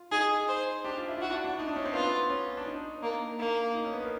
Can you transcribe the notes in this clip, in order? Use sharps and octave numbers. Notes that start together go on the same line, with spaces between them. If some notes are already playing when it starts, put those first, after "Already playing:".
Already playing: F4
D#4 G#4
C5
D4 G4
F4
E4
F4
E4 F#4
D4
D4
D#4
D4
C#4
C4
B3 F4
C#4
D4
D#4
A#3 D4
A#3
D#4
C#4
B3
A#3